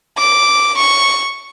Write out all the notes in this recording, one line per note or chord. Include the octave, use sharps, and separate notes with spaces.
D6
C#6